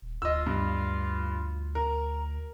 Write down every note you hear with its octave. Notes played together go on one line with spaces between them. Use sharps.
D#1
D2 F4 D#5 E6
G2
A#4 A#5